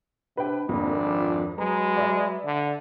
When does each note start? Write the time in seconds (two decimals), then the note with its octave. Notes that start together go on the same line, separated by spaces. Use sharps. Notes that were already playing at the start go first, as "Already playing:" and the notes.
0.37 C3 D4 B4 G5
0.69 G#1 F2 A#3 D4
1.07 F3
1.58 F#3 G#3 B4 A#5
1.97 D5 E5
2.45 D3